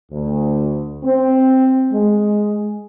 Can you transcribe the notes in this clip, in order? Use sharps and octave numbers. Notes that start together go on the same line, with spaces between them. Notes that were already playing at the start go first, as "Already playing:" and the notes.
D2
C4
G#3